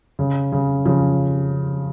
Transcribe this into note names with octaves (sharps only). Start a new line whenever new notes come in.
C#3
C#3
C#3 F3